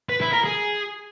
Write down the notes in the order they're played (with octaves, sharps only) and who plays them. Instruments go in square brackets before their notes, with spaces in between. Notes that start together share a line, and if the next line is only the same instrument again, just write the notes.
[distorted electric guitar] B4
E4
A#4
G#4